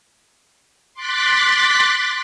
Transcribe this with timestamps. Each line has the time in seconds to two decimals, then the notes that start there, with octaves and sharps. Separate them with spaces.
0.94 C6 D6 F#6 A6 B6